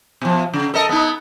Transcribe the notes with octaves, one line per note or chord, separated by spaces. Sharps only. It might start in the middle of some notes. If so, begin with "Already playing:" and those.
B2 F3
C#3
A4 A#4 D#5
B3 D#4